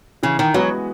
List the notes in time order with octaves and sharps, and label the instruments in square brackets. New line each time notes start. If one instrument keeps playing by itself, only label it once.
[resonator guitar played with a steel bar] C#3 [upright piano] E3
[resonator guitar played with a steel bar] D#3
[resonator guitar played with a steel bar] F#3 [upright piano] G#3 B3 F#4 B4